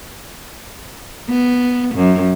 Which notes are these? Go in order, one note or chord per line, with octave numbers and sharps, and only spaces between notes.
B3
F#2